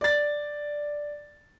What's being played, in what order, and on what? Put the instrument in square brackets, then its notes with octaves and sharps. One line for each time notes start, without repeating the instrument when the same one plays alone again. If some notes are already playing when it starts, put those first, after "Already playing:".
[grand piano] D5 A6